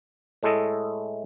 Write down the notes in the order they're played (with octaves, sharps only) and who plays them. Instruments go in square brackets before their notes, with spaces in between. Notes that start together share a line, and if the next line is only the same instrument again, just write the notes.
[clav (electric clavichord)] A2 G#3 A3 E4 A4 D#5